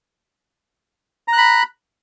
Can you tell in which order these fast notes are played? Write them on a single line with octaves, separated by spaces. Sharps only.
A#5 F#6 B5